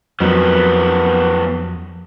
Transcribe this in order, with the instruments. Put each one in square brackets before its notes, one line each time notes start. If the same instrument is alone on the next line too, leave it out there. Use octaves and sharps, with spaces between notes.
[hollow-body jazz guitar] F2 F#3 [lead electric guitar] D#3 B3